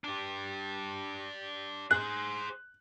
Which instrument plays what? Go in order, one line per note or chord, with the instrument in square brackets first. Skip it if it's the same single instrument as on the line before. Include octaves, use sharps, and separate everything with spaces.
[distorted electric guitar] D4 G4
[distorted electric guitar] G#4 C5 [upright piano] F#6